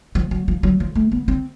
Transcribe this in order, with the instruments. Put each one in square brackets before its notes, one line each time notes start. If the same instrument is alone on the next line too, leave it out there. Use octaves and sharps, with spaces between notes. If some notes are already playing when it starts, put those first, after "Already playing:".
[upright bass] F3
F#3
F3
F#3
F3
A3
B3
C4